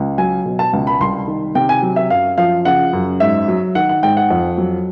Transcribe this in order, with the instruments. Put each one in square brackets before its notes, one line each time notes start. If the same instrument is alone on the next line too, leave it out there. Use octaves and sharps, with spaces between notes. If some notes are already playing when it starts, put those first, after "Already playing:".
Already playing: [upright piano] C#2
F#3 G#5
B2
A5
C#2
B5
C2 C6
D#3
C3 G5
G#5
F#3
E5
F#2 F5
F3 F5
C#3 F#5
F#2
G#2 E5
F#3
D#3 F#5
F#5
G#2 G5
F#5
F2
F#3